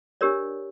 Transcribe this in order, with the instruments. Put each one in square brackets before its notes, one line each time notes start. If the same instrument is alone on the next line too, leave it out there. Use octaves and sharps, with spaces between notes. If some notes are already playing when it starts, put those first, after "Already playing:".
[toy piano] D4 G4 A#4 C#5 D5